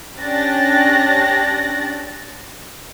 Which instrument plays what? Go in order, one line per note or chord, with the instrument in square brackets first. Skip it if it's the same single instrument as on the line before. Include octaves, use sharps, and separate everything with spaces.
[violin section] C#4 D4 G4 F#6 A6 A#6